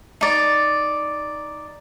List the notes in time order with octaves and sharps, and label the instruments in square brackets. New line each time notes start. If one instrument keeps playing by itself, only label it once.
[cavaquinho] D#4 D5